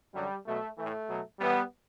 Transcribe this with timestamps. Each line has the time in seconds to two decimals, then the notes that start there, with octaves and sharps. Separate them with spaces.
0.14 F#2 D3 F#3 G3
0.46 B2 F#3 A3
0.77 A2 E3 A3
1.08 B2 F#3
1.39 A2 E3 G3 B3